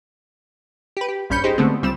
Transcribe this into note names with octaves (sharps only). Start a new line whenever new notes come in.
G4 B4
G4
A#1 G2 C#4 B5 G6 C#7
D#4 G4 G#4 C5
D3 G#3 A3 B3 C4
C#2 G3 C4 E7